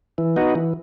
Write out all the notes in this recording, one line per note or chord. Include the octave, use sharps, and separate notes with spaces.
E3
B3 D#4 F#4
E3